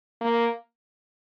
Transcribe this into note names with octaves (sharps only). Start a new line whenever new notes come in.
A#3